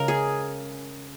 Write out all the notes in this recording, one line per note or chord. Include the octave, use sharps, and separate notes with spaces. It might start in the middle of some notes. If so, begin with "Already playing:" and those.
Already playing: C#3 G#3 A#4
G#4